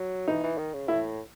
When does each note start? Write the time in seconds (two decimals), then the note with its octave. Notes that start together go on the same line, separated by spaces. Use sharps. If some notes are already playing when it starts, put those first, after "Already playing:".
Already playing: F#3
0.28 E3 D#4
0.43 E3
0.58 D#3
0.74 C#3
0.88 A2 E4